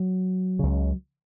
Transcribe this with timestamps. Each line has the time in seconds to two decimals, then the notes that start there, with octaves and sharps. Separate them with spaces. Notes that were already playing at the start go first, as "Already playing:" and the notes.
Already playing: F#3
0.59 C#2 C#3